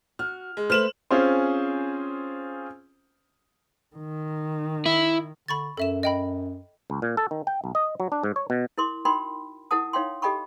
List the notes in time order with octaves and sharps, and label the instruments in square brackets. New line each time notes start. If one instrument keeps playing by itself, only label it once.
[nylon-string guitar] F#4 [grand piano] F6
[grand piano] G#3
[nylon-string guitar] A3 B4 C5 [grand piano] F6 E7 F#7
[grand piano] C4 C#4 F4 G#4 C5
[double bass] D#3
[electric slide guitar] E4
[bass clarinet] D3 [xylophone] B5 C#6 A6
[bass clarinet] F#2 [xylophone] A4 E5 E7
[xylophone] D#5 G5 B5
[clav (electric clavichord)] C#2
A#2
A4
D#3
G5
B1
D#5
F#3
D4
G#2
C#5
B2
[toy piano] E4 A#4 C6 D6
D#4 F#4 A#4 G5 B5 C6
E4 A#4 F#5 A5 D#6
D#4 C#5 F5 G5 C6
G4 A4 D#5 G5 B5 C#6